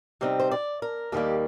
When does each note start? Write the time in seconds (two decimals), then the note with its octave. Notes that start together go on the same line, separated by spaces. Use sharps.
0.21 C3 G3 C4 D#4 G4
0.40 C5
0.51 D5
0.82 A#4
1.12 D#2 D#3 G3 A#3 G4